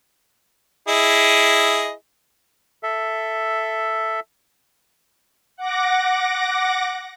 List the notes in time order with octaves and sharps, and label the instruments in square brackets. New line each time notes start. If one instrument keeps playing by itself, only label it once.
[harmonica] E4 G#4 D#5
[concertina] A4 E5
[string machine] F#5 D6 A#6